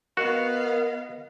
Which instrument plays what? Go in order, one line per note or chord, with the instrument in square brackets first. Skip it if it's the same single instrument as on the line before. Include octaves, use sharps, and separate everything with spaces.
[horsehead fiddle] B3 F5 [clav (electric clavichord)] F#4 [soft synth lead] A#4 [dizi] D#5